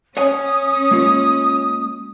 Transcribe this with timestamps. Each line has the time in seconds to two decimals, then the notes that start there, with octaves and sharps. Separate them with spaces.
0.17 C#4 C#5 F#5 G#5 D#6
0.91 G#3 A#3 F4